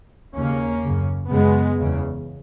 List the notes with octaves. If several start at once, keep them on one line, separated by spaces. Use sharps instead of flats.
D#2 C#3 A#3 C#4
F#2 C#3
F#2 C#3 G#3 B3
E2 C#3